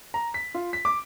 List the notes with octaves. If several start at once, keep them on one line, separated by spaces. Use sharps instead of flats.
A#5
B6
F4
B6
D6